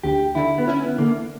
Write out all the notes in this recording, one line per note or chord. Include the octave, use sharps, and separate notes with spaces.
D2 G4
D3 E4
B3
C#4 E4
B3
D3 A#3